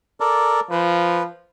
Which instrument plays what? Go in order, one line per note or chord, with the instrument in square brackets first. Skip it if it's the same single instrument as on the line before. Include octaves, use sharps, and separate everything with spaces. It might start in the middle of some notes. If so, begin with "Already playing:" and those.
[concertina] A4 A#4 D5
[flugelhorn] F3 [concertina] B4